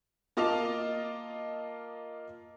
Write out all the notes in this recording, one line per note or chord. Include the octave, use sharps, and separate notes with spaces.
A#3 F4 D#5 A5 D6 F7